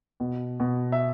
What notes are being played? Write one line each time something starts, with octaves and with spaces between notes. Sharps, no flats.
B2
B2
E5